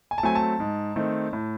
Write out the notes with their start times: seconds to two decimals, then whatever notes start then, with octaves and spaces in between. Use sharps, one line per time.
0.11 G#5
0.18 A5
0.23 F#3 A3 C4 G#5
0.35 A5
0.60 G#2
0.96 D#3 A3 C4
1.33 A2